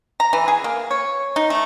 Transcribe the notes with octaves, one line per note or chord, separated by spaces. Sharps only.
A#5
E3
G#4
A#3
C#5
D#4
A3